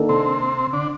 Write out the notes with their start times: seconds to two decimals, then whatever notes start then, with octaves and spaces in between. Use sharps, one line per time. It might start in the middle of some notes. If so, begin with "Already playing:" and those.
Already playing: D#3 A#3 D4 A4
0.09 C3 C4
0.73 D3 D4